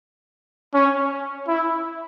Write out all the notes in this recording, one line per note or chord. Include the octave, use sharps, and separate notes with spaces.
C#4
E4